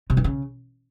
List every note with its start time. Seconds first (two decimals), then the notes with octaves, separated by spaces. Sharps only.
0.10 C3
0.17 E3
0.24 C#3